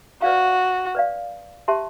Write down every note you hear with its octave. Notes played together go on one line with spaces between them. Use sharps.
F#4 B4 D5 F5
B4 D5 F5
G4 C5 E5 A5 C6